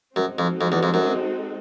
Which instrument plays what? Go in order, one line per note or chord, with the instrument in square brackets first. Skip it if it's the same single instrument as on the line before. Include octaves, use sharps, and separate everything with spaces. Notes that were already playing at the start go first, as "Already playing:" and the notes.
[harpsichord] F#2 [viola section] G#3 C4 D#4 F#4 A4
[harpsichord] F2
F2
E2
F2
F#2